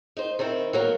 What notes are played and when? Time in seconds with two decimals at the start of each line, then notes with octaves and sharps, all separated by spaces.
0.17 D#4 C5
0.39 D#3 C4 D#4 E4
0.73 F#3 A#3 B3